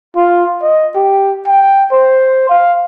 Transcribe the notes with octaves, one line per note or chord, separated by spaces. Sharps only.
F4
D#5
G4
G5
C5
F5